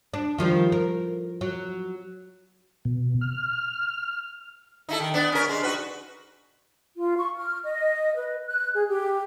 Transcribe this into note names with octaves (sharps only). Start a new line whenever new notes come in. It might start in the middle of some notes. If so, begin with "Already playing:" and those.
D4
D#3 F3 G3
A#4
F#3
B2
F6
D#4 E4 A4
D#3
B3 D4
C#4 A#4
G#3
D#4 F#4 B4
F4
C#6
F6
D#5
B4
F#6
G#4
G4